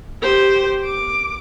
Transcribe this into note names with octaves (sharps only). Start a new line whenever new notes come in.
G4 C5
D6